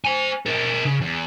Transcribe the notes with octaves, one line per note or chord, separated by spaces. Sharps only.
C5 G#5
D4 A#4
C#3
E2